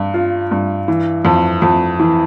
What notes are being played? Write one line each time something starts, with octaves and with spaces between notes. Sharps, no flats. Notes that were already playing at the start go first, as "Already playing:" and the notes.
Already playing: G2
F4
G2
E3
F2
F2
E3